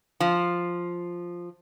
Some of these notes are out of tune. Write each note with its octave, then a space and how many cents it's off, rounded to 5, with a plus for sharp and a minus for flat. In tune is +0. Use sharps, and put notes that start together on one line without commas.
F3 +0 F4 +0